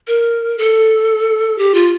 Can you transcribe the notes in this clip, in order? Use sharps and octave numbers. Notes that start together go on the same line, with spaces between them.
A#4
A4
G4
F4